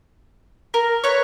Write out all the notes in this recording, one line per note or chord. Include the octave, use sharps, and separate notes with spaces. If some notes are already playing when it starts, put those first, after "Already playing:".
A#4
B4 C#5